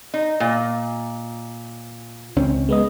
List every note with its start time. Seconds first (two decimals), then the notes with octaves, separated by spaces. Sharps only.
0.14 D#4
0.40 A#2
2.36 C#2 C4 C#4
2.69 G#3 B3 D#5